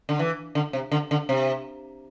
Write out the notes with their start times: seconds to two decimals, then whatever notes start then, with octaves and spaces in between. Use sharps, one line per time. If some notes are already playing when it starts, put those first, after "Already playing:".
0.09 D3
0.19 E3
0.55 D3
0.73 C3
0.92 D3
1.11 D3
1.29 C3